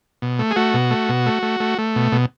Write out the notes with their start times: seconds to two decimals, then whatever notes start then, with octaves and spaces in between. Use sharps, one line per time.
0.22 B2
0.39 A3
0.51 G#4
0.56 A3 F#4
0.74 B2
0.90 A3
1.09 B2
1.26 A3
1.43 A3
1.60 A3
1.78 A3
1.96 B2
2.12 B2